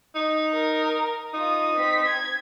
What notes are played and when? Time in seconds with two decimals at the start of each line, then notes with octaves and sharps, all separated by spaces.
0.16 D#4
0.54 A#4
1.34 D#4 F4 D#6
1.74 C4 B6
2.07 G#6